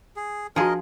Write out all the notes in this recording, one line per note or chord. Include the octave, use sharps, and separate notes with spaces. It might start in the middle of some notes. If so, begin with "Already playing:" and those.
G#4
F3 D4 F#4 G#4 A#4 D#5